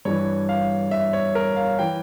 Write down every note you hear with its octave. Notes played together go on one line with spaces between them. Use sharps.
G2 E3 C#5
F5
E5
C#5
A#4
F5
E3 G5